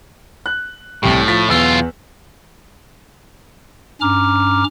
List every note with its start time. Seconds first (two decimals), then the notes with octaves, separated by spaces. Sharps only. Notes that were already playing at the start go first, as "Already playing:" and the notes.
0.46 F#6
1.03 C2 A2 G4
1.28 F3 A6 B6
1.49 B1 E2 F4 E6
4.01 G2 C#4 A#5 D6 F6